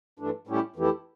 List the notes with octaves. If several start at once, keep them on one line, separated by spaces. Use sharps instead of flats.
G2 E3 A3 D4
A2 G3 C#4 E4 G4
F2 E3 A3 E4 G4